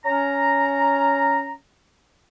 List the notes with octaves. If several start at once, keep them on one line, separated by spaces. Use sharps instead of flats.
C#4 A#5